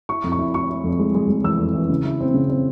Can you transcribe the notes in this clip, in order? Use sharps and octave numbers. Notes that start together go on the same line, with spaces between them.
E4 C#6
F2
C#6
E4
E4 C#6
E4
F2
G#3
G#3
G#3
E3 E6
F2
E3
C#3
E4
C4
C#3
C4